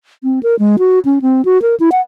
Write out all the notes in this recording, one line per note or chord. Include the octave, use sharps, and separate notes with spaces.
C4
A#4
G#3
F#4
C#4
C4
F#4
A#4
E4
F#5